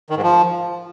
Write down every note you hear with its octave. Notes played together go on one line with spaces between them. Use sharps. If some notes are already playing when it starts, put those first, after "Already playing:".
D#3
G#2
F3